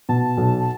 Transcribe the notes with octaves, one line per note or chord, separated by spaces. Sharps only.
B2 A5
B1